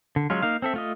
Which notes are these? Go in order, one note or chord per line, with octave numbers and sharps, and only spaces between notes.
D3
F#3 G#3 C#4 F4
A#3 D#4 F5
C4 A4 E5
A3 F4 D#5